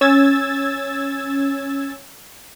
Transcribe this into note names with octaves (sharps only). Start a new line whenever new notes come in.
C#4 E6 G#6 A6